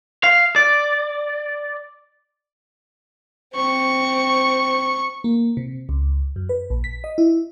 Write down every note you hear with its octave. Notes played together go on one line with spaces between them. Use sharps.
F5
D5
C4 C#6
A#3
C3
C#2
F#2
B4
A#1
B6
D#5
E4